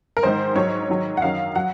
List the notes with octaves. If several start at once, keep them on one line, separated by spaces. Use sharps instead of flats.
A#4
G#2 D#3 G#3 C5
G#2 F#3 C#5
G#2 D#3 F#3
F#5
F#2 D#3 F#3 F5
F#3 F#5